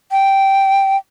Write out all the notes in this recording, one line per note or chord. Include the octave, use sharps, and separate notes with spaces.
G5